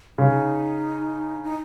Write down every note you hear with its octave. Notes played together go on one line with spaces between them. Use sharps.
C#3 D#4
D#4